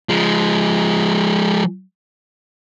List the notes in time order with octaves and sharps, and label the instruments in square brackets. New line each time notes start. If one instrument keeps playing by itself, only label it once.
[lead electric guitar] F3 G#3